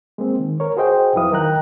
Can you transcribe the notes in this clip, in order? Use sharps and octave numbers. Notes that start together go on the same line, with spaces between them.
G#3 A#3 C4
D#3
A#4 C#5
F#4 G#4 C5 D#5 G5
F2 F#3 E4 B4 F5 D#6
D#3 A#4 D#5 G5 A#5 F#6